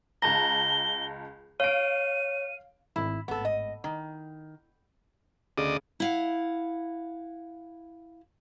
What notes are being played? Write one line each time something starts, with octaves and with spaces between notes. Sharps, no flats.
C#2 A5 A#5 A#6 G7
C#5 F5 D7 D#7
G#1 E4
G#1 A2 B3 A4
D#5
D#3 E4
D2 C#3 D5 D#5
E4 F5 F#5